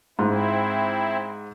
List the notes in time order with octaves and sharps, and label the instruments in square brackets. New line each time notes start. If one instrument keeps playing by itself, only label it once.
[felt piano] G#2 F4 [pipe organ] C4 E4